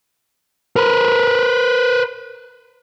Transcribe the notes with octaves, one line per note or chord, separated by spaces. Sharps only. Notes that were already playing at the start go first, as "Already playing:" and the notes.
A#4 B4